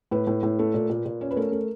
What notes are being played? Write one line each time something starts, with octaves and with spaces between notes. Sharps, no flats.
A2 B4
A2
A2
A3
A#2
A#2
A#2
C#4
B4
A3 A#4
A3